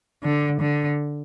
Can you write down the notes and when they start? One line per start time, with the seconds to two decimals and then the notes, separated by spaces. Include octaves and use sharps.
0.23 D3
0.60 D3